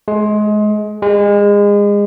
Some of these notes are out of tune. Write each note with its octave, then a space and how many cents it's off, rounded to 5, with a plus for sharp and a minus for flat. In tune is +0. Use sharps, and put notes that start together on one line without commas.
G#3 +25
G#3 -30